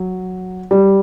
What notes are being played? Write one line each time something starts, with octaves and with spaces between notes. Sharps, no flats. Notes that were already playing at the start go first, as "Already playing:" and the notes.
Already playing: F#3
G3